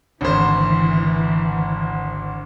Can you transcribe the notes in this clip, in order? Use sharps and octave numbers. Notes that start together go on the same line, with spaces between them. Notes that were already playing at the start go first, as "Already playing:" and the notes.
G#1 D2 E3 C5